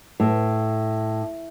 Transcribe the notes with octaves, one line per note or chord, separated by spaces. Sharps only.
A2